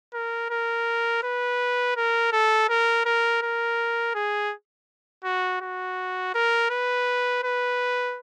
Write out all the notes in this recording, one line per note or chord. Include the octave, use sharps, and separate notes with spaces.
A#4
A#4
B4
A#4
A4
A#4
A#4
A#4
G#4
F#4
F#4
A#4
B4
B4